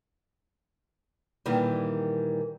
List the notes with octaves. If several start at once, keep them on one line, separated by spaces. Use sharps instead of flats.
A#2 D#3 E3 G3